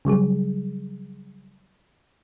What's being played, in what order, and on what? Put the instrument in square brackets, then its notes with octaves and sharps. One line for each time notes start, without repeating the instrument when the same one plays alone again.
[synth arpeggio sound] C#3 F#3 G3 G#4